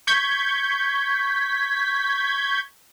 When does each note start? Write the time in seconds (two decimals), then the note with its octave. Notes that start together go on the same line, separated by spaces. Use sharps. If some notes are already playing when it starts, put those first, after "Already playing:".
0.07 C#6 G6 G#6 B6